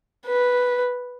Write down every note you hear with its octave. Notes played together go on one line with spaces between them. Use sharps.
B4